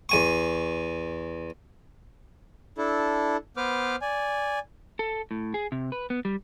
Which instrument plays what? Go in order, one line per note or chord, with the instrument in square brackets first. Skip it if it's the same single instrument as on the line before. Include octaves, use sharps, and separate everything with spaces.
[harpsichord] E2 G#5 C#6
[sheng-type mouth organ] D4 E4 A4
B3 B4 C5 D6 F6
D5 G#5
[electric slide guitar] A4
A2
G#4
C3
B4
B3
G3